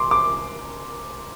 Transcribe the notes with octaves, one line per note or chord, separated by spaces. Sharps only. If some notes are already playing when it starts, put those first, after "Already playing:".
Already playing: C6 D6
D6